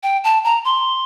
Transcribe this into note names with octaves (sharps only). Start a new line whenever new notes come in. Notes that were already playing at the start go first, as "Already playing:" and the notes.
G5
A5
A#5
C6